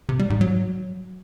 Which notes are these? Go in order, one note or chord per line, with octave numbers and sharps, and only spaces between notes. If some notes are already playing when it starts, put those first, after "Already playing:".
C3
G3
G#2
F#3